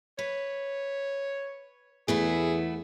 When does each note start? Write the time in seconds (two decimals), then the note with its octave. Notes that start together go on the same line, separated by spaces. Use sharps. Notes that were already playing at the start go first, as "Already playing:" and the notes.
0.19 B4 C#5
2.08 E2 A3 B3 E4 G#4